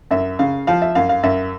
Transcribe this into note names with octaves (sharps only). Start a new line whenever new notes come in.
F#2 E5
C#3 F5
F3 F5
E5
F#2 F5
F5
F#2 E5